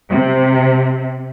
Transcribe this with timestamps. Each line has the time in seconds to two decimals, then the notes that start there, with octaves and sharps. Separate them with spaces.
0.12 C3